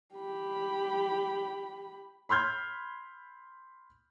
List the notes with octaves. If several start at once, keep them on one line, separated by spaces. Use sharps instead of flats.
G4 B5
B5 C6 F6 G6 G#6